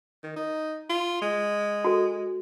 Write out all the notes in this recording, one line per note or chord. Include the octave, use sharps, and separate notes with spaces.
D#3
D#4
F4
G#3
F#4 A4